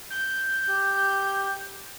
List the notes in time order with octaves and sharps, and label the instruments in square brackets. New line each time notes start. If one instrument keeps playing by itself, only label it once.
[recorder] G6
[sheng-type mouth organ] G4